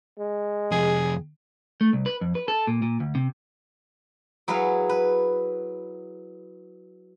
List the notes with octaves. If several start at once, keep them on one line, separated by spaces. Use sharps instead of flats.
G#3
F2 C3 G#4
A3
C2
B4
F2
B4
A4
A#2
A#2
D2
C3
F#3 E4 G#4 B4 C#5 F5
B4